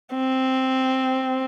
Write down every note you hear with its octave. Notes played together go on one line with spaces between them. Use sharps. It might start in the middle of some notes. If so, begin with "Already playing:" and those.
C4